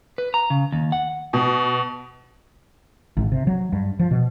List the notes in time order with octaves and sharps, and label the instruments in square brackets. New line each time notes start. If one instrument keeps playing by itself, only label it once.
[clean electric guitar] B4
A#5
C#3
D#2
F#5
[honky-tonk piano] B2
[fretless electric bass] G#1
C3
F#3
G2
F3
B2